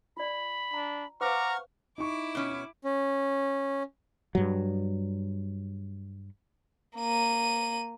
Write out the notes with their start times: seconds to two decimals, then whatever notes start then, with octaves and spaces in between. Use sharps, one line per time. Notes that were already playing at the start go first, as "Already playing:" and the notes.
0.17 F4 D5 B5
0.73 D4 A#5
1.21 B4 C5 F5 F#5 A#5 C#6 D6 F6
1.98 D#4 E4 C#6 D6
2.35 B2 C#4
2.84 C#4
4.35 G2 F#3
6.97 A#3 D#7